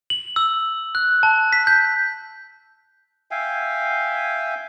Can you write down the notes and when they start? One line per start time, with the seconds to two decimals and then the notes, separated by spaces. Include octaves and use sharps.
0.10 F#7
0.36 E6
0.95 F#6
1.23 A5
1.53 B6
1.67 G6
3.31 E5 F5 G5 G#5